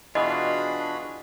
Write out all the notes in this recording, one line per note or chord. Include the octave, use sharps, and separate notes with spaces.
B2 E3 D4 F4 F#4 G#4 D#5 B5